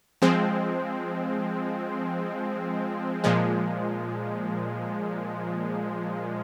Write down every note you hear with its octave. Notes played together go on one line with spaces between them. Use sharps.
F3 G#3 C4
A#2 F3 G#3